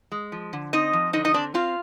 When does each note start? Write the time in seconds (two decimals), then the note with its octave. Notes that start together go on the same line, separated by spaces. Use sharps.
0.12 G#3
0.32 F3
0.53 D3
0.73 C4 D#4 D#5
0.93 F3
1.13 D3 D#4 D#5
1.25 D#4 D#5
1.34 C4 D4 D5
1.54 C4 F4 F5